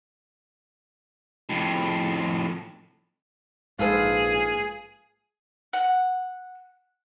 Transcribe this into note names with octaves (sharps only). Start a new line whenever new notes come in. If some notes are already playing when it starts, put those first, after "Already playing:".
F2 A2
A#1 G#2 F4 G#4 A4 B4
F#5